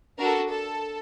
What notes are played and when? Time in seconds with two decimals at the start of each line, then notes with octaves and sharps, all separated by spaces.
0.19 D4 F#4 A4 A#4
0.50 A4